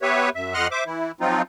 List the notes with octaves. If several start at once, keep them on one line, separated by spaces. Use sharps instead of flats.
B3 G4 B4 C#5 E5
F#2 E5
F2 D#5 F#5 C6 F6 F#6
C5 E5 D6
E3 E4
F3 F#3 C4 D#4 F4